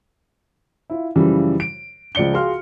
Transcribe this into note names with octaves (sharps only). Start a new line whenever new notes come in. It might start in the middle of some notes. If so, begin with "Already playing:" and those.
E4 F4
F#2 C#3 E3 F3 G3
D7
C#2 F3 D5 C#7 G7
F4 F#4 G#4 F5 C6 F6